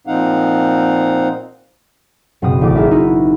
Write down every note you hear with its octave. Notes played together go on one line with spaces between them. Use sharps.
A#2 F3 C4 D#4 F5 F#5
F#1 B2 C4 F#4 D#6
A1 D6
D#4 G#4 A#4 E5
D#4 E4 F#4